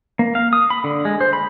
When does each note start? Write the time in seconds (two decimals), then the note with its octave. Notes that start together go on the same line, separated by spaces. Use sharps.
0.19 A#3
0.35 F5
0.53 D#6
0.70 B5
0.84 D3
1.05 G#3
1.21 C5
1.33 B5